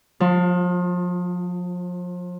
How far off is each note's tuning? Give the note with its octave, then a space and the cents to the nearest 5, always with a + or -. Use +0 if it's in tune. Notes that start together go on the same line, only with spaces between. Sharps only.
F3 +35 F4 +0